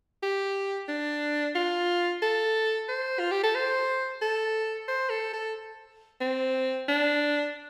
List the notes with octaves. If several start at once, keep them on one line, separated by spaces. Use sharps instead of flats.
G4
D4
F4
A4
C5
F4
G4
A4
C5
A4
C5
A4
A4
C4
D4